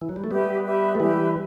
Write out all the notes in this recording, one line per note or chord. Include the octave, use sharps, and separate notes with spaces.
E3
F#3
G3
A3
G3 B3 G4 B4 E5
G4 B4 E5
A3
E3 G3 G4 B4 E5